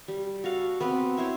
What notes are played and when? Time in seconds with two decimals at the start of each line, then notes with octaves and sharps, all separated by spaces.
0.08 G3
0.44 F#4 A4 F5
0.80 B3 C4 B4
1.17 E4 C5 C#5